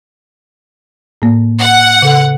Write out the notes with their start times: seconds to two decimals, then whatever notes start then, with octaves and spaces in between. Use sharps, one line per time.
1.22 A2 A#3
1.62 F#5
2.02 C#3 A4